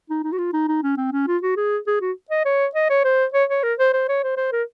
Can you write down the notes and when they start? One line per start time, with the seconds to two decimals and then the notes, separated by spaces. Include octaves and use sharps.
0.10 D#4
0.23 D#4
0.32 F#4
0.38 F4
0.53 D#4
0.68 D#4
0.83 C#4
0.97 C4
1.12 C#4
1.27 F4
1.42 F#4
1.56 G#4
1.87 G#4
2.01 F#4
2.31 D#5
2.45 C#5
2.75 D#5
2.90 C#5
3.04 C5
3.34 C#5
3.49 C#5
3.63 A#4
3.79 C5
3.93 C5
4.09 C#5
4.23 C5
4.37 C5
4.52 A#4